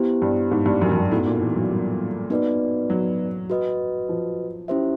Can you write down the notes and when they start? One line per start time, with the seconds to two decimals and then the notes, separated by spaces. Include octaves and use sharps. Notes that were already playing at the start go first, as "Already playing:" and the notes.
Already playing: B3 E4 G4 C5
0.22 G2
0.51 G#2
0.66 G2
0.82 F#2
0.92 F#2
0.96 G2
1.11 A2 B3 D#4 F#4
1.26 A#2
1.41 E3
1.56 F#3
1.70 G3
2.30 B3 D#4 F#4 B4 D5
2.90 F#3
3.50 F#4 B4 D#5
4.09 F3
4.68 C#4 E4 G4 C5 E5